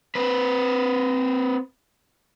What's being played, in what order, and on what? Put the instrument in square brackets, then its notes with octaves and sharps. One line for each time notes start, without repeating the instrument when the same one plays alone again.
[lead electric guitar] C4 B4